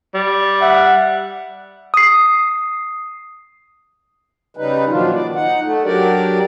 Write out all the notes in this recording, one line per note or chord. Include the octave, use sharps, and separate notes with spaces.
G3
E5 F#5
D#6 C7
C#3 G3 D#4 B4
A#2 D#3 F3 F#3 D4 F4
D5
D#4 F#5
A3
F#3 D4 G4 A#4 D5